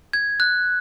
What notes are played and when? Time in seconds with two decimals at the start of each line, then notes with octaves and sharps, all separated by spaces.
0.13 G#6
0.40 F#6